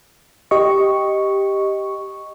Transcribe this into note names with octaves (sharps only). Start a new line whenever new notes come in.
G4 D#5 C#6